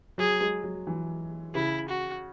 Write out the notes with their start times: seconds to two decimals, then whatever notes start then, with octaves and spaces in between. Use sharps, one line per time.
0.18 F#3 G#4
0.41 G#3
0.64 F#3
0.87 E3
1.55 C#3 E4
1.89 F#4